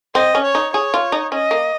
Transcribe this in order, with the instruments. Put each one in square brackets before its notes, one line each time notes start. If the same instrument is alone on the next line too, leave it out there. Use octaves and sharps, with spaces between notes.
[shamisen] C4 [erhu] D#5
[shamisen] C#4
[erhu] C#5
[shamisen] D#4
[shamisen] G#4 [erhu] C#5
[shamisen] F4
D#4
[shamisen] C#4 [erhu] D#5
[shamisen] A#3